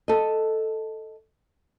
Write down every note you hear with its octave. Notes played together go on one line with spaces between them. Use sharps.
A4 D#5